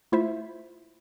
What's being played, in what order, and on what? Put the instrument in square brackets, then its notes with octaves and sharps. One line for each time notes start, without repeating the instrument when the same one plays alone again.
[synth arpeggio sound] A3 E4 F4 C5 E5